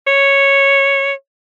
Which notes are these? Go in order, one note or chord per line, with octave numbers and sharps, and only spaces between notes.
C#5